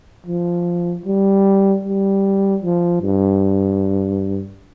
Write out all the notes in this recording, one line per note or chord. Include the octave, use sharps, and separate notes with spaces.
F3
G3
G3
F3
G2